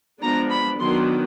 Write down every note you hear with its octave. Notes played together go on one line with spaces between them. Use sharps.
F3 G#3 B3 D4 A#5
B5
D#3 F#3 B3 D4 C6